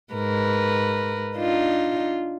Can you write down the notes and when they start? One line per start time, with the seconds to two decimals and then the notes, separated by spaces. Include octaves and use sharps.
0.14 G#2 A#4 B4
1.35 D4 D#4 F4